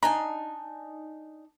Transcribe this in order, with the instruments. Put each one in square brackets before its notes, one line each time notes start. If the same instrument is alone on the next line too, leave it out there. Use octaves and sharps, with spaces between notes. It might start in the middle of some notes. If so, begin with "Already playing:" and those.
[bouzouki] D4 D#4 G#5 [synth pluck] A#5